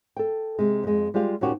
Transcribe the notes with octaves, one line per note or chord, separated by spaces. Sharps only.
A4 G5
C3 G#3
F2 G#3
G3 G#3 F4 G4 F5
D#2 A#2 C#4 F#4 G4